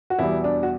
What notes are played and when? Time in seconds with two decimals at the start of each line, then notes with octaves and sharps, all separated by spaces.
0.10 F#4
0.19 E2 B2 G3 E4
0.44 D4
0.63 F#4